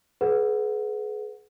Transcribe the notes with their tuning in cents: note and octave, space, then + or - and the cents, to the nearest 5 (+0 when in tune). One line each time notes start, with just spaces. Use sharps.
G#4 +35 B4 +0 F#5 -10